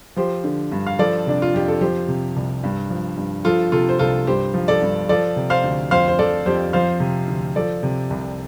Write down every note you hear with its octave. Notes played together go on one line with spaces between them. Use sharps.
F3 G4 C5
D3
G2
F5
F3 A4 D5
C3 D4
F4
F2 G4
A4
F3 G4 C5
C3
C2
G2
F3
G2
F3 F4 A4
C3 F4 A4
C5
C2 F4 A4
G2 G4 C5
F3
A4 D5
G2
F3 A4 D5
C3
C5 F5
D2
F2 C5 F5
C5
F3 A4 D5
F2 G4 C5
F3 C5 F5
C3
D2
F3 A4 D5
C3
C2